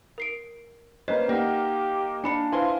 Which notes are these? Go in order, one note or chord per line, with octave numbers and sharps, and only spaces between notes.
A#4 C7 D7
A#3 C#4 B4 C5 D#5
A#3 D#4 G4 A#4 D5 F#5
D4 G#5 B5 C#7
E4 F4 B4 C5 F5 G#5 C6